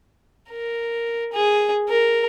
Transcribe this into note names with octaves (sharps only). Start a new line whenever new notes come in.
A#4
G#4
A#4